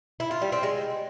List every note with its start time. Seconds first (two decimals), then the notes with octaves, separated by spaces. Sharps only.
0.20 E4
0.31 F4
0.41 G3
0.52 C4
0.63 G#3